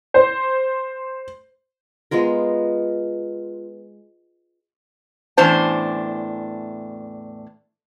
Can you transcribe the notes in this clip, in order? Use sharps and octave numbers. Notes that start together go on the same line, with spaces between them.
C5
G#3 B3 F4 A#4
E2 A2 C#4 D4 C5 A5